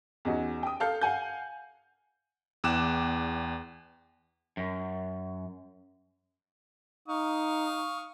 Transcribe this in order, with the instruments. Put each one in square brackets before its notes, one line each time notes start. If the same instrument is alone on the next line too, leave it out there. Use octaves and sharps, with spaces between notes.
[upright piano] E2 C#4 D#4 F#4
G5 D#6
A4 F5 F6 G6
F5 F#5 G#5 G6
[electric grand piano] E2 G5 D6 F#6 E7
[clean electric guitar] F#2
[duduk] D#4 [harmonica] F5 C#6 D#6